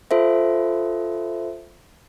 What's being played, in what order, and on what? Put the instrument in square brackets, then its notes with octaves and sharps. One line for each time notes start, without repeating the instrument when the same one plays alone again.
[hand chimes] F4 A4 C5 E5